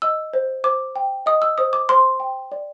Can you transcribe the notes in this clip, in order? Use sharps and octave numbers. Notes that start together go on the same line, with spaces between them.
D#5 E6
C5
C5 D6
G5
D#5 D#6
E6
C5 D#6
D6
C5 C6
G5
D5